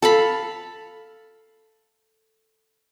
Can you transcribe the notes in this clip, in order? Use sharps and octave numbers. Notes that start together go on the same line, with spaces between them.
A4 F5 B5